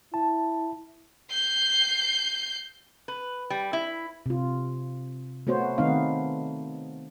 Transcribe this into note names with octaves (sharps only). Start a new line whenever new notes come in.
E4 A5
G6 C7
B4
G3
E4
C3 F4
A3 B3 F#4 C5 C#5
D#3 A3 B3 C4 D#4 F5